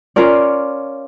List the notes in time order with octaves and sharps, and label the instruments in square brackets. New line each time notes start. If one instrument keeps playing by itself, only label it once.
[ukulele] C#4 F4 A#4 D5